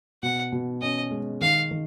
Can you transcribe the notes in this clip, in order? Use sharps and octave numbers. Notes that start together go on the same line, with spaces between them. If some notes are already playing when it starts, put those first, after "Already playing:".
B2 F#5
B2
C#4 D#5
G#3
D#3 F5
D#3